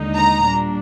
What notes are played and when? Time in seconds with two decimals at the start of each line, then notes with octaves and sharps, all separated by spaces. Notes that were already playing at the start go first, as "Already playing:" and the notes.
Already playing: D#2 D3 G#3 D#4
0.16 A#5
0.45 A#2 G3 D4